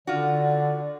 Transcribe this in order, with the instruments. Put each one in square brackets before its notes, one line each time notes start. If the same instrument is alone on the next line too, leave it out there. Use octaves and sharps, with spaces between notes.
[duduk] D3 [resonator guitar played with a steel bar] F4 F#4 [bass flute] D5